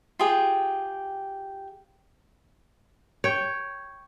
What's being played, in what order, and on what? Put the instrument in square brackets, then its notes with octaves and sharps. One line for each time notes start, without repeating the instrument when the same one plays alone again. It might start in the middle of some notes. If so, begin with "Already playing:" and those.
[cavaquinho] F4 G4 G#4 G5
[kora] C#5 G5